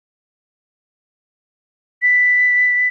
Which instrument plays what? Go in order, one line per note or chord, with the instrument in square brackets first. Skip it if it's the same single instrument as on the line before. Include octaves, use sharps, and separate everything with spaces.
[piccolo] B6